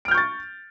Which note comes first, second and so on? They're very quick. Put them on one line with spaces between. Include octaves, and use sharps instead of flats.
D7 F6 G6 C#6 A6